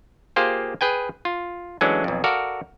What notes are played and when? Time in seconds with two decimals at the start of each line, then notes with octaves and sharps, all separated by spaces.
0.36 A#3 F4 G4 G#4 C5
0.81 G#4 B4 G5 G#5
1.25 F4
1.81 E3 F#3 G#3 A3 C#4 D4
2.04 B1 F2
2.24 F#4 A4 A#4 D5 F5